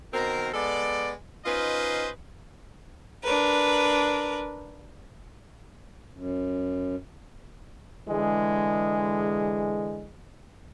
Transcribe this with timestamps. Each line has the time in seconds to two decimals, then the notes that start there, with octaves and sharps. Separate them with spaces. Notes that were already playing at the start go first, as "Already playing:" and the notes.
0.14 B2 D#3 C4 A#4
0.54 G#3 B3 A4 D5
1.46 C#4 D#4 F4 B4 C5 D#5
3.24 D4 A#4 B4
6.14 F#2
8.07 D3 E3 G#3